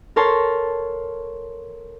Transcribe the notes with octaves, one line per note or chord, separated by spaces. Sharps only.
A4 A#4 C#5 A5 C6